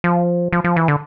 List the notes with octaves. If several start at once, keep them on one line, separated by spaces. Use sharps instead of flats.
F3
F3
F3
E3
D3